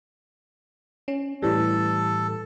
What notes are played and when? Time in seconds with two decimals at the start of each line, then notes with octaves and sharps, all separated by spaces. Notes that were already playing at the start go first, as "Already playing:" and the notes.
1.08 C#4
1.42 A2 E3 G3 A4